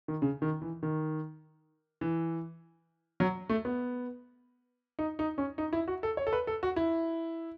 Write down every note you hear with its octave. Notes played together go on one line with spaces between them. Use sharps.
D#3
C#3
D#3
E3
D#3
E3
F#3
A3
B3
D#4
D#4
C#4
D#4
E4
F#4
A4
C#5
A4
B4
A4
F#4
E4